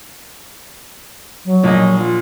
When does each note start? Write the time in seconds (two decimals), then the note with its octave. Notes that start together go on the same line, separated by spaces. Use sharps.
1.45 F#3
1.64 A#1 D#5
1.98 F4